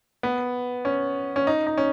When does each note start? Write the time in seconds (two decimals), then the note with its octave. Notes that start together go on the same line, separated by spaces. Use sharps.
0.23 B3
0.85 C#4
1.36 C#4
1.47 D#4
1.67 D#4
1.78 C#4